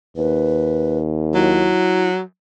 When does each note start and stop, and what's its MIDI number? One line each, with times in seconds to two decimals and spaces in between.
0.17 1.76 39
0.17 0.99 71
1.34 2.22 54
1.34 2.09 64